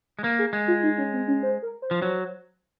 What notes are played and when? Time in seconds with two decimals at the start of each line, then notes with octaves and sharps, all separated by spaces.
0.19 G#3
0.24 A#3
0.39 G#4
0.53 G#3
0.68 F4
0.83 D#4
0.98 C#4
1.13 C4
1.28 C#4
1.43 C5
1.62 A#4
1.82 C5
1.91 F3
2.02 F#3